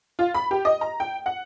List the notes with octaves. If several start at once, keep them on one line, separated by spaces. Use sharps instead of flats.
F4
B5
G4
D#5
A#5
G5
F#5